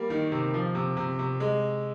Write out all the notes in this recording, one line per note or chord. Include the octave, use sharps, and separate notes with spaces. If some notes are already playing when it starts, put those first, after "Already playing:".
Already playing: G3 A#3
D#3
C3
F3
C3
C3
C3
G#3